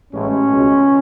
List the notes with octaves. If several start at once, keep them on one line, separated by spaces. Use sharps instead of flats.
A1 A2 G#3 C#4
C#2 B2 G#3